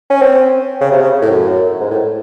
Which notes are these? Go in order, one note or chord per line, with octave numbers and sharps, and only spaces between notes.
C#4
C4
C#3
C3
C#3
A2
F#2
G#2
A2